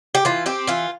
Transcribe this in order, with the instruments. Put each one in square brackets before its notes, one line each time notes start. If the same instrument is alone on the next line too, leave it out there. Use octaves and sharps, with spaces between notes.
[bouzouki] G4
E3 F4
C4 G4
E3 F4